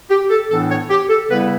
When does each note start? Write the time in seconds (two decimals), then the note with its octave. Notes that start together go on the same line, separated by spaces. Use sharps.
0.10 G4
0.30 A4
0.50 A2 E3 B3 D4 A4
0.70 C#5
0.90 G4
1.09 A4
1.30 C#3 G3 B3 E4 B4